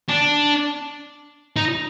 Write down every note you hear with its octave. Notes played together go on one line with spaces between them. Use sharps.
D4
D#4